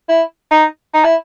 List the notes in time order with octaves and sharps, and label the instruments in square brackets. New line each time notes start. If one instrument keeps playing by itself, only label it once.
[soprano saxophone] E4
D#4
D#4
E4